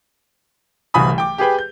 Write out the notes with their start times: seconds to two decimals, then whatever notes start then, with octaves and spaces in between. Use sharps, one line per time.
0.94 D1 C2 E3 G#5 B5 D#6
1.18 G5 D6
1.38 G4 G#4 B4 G5
1.59 G6